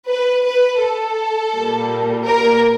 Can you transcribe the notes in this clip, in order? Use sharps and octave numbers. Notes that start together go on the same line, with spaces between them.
B4
B4
A4
A#2 G3 A#3
A#4